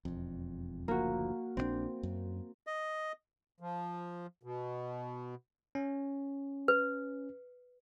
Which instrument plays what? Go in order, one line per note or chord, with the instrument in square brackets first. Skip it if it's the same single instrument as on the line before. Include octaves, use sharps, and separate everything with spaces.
[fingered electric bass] E1 F2
[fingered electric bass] F#1 D2 F3 [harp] A#3 F#4
[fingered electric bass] A#1 E3 D4 [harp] C4
[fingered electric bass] F#2
[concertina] D#5
[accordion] F3
B2
[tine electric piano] C#4
[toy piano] B4